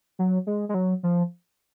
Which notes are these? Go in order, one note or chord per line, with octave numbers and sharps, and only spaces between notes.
F#3
G#3
G#3
F#3
F3